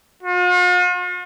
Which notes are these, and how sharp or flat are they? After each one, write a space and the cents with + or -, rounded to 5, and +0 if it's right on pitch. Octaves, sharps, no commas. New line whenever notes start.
F4 +45